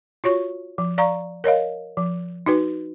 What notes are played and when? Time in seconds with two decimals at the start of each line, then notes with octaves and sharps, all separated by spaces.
0.24 F4 F#4 C#5 C#6
0.78 F3
0.98 D5 F5 A#5 C#6
1.44 A#4 C#5 D#5 F5
1.97 F3
2.46 D#4 F#4 B4